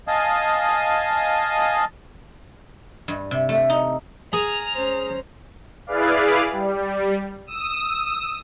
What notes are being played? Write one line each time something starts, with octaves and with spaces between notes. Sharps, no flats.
D#5 F5 G#5 A5 D#6
G2
C3
A3
D#4
G#4 A#5 F6
C#4 C5
E4 G#4 B4 D5 F5
G3
D#6 E6